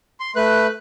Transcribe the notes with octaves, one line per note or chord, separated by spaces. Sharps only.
C6
A3 B4 F#6